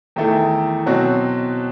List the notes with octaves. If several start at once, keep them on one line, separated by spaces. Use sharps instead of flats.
E2 D#3 A3 E4 A4
B2 F#3 C4 F#4